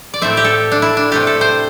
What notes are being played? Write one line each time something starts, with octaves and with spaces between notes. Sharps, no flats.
D5
A2 A3 C4 E5
G4
A4
D4
E4
D4
C3 A3 D4 G4
A4
C5